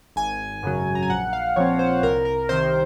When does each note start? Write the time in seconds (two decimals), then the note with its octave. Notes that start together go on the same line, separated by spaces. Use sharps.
0.16 G#1 G#5
0.63 F#2 C#3 F#3
0.95 A#5
1.03 G#5
1.10 A#1 F#5
1.33 F5
1.56 A#2 F3 C4 C#5
1.79 C5
2.03 C2 A#4
2.25 A#4
2.49 C3 D#3 C5